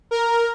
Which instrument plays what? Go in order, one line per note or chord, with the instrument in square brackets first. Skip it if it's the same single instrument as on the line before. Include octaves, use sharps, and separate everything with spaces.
[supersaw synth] A#4